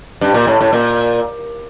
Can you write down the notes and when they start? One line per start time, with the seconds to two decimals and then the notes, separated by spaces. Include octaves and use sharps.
0.21 G2
0.34 A#2
0.47 A2
0.61 A2
0.73 A#2